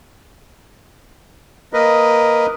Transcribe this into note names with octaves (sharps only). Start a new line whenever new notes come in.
A#3 A#4 B4 D#5